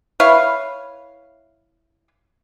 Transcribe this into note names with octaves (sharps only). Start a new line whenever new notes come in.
E4 B4 C#5 F5